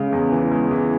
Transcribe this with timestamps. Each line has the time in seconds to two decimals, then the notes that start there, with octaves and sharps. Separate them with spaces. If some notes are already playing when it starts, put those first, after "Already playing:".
Already playing: C#3 G#3
0.13 E2
0.32 E3
0.51 G#3
0.71 E3